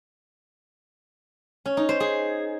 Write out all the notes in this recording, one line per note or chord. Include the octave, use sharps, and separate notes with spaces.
C#4
D#4
C5
G#4